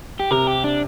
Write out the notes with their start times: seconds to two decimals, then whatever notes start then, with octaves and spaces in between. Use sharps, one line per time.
0.20 G4
0.31 C3 A#4
0.47 G4
0.64 D4